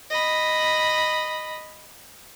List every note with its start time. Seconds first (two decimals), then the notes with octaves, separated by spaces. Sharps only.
0.10 D#5 B5